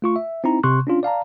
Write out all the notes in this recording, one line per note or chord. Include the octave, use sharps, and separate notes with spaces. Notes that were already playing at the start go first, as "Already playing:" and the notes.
A3 F4 C#6
E5
C4 D#4 E4 A#5
C3 C6 C#6 F#6
C#4 D4 F4
D5 F5 A5 A#5